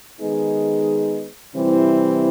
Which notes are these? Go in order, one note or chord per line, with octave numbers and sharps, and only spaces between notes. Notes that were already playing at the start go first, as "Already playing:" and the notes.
D#3 G#3 B3 D#4 G#4
C3 E3 G3 C4 E4